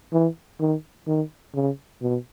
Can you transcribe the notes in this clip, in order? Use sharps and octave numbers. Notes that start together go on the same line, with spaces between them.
E3
D#3
D#3
C#3
B2